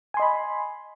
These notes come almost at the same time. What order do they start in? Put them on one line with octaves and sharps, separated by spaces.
G#5 C6 D#5 B5